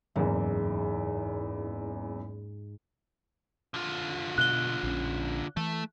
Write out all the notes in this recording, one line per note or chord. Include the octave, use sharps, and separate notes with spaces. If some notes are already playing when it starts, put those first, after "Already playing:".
F#1 E2 G#2
D3 F4
B2 F#6 G7
A#1 C#4
E3 A3